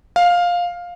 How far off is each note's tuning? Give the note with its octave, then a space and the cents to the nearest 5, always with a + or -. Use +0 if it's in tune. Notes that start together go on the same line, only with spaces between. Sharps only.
F5 +10